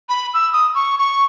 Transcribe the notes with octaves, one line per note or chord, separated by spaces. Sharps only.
B5
E6
D#6
C#6
C#6